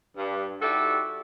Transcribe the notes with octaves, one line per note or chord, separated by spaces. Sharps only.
G2
G3 D#4 E4 F#4 G4 A4